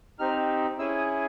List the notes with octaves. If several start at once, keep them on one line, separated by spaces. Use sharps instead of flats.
C4 D#4 G4 F6
C#4 E4 G#4 E6
D#6